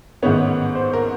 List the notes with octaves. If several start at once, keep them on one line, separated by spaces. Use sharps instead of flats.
A1 G#2 D#3 G#3 B3 C#5
C5
A#4